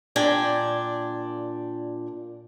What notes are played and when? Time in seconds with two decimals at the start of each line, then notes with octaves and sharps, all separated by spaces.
0.16 A#2 D4 D5 G5 G#5